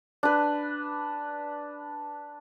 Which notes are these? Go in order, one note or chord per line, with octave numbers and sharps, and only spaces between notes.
D4 B4